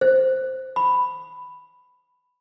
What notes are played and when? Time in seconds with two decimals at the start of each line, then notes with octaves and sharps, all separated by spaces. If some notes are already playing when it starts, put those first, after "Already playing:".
0.01 C5
0.76 B5